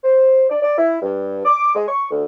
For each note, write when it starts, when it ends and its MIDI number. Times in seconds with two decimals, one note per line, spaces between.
0.03 0.44 72
0.50 0.62 74
0.62 0.72 74
0.77 0.97 64
1.02 1.40 43
1.45 1.74 86
1.74 1.87 56
1.88 2.06 85
2.10 2.24 38